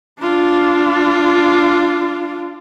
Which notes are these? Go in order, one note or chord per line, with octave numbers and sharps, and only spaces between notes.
D4 F4